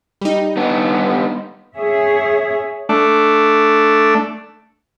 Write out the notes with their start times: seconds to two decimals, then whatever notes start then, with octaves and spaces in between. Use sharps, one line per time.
0.21 G3 D#4
0.57 B3 D4
1.75 G#4 C#5 E5
2.89 A3 D4